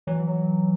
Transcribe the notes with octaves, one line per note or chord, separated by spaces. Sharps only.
E3 F#3
F#3